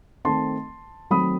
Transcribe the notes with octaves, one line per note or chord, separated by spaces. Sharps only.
D#3 A3 C4 A5 C6
D#3 F#3 A3 C4 B5 D#6